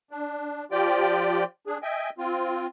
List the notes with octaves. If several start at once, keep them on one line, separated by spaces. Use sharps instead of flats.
D4
F3 F4 G4 D5 G5
D4 G#4
D#5 E5 G5 G#5
C4 F4